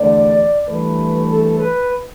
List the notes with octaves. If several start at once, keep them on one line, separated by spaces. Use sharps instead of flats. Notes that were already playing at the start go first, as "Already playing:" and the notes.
Already playing: E2 D3 A3 D5
G2 E3 A3 B4
A4
B4